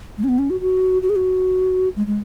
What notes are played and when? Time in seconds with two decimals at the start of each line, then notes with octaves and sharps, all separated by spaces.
0.18 G#3
0.24 C#4
0.29 B3
0.39 C#4
0.50 F#4
0.61 F#4
1.02 F#4
1.10 G#4
1.16 F#4
1.96 G#3
2.07 G#3